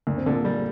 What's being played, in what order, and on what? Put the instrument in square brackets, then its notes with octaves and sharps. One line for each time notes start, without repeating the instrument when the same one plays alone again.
[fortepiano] D2 [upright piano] A#3
[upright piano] C4
[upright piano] A#2 A#3 [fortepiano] D3
[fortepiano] G3